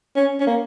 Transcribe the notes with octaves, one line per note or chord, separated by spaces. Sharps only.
C#4
C#4
A#3